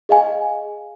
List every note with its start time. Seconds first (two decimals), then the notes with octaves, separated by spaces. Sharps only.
0.09 G#4 D#5 F5 G#5